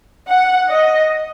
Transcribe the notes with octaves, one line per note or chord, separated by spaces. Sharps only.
F#5
D#5